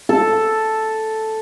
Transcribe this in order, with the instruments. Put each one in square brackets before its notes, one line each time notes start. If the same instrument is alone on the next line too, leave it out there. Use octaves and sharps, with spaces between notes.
[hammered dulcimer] A4